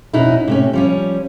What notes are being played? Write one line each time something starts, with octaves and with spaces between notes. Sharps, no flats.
F2 B2 C#4 D#4 E4
C3 A3 C#4
F3 G3 C#4